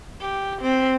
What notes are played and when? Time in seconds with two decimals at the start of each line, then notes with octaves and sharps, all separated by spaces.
0.21 G4
0.61 C4